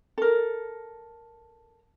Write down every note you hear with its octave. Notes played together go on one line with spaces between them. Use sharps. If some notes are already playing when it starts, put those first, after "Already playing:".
A4 A#4